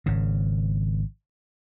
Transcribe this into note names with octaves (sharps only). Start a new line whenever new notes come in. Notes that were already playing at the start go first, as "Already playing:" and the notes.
G#1 C#3